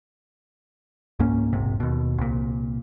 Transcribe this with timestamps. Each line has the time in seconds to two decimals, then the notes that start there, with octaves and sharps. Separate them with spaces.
1.19 C#2 G#2 A#3 C#4
1.53 E1 A#1 G#2 C3
1.80 D#2 B2
2.18 C2 A#2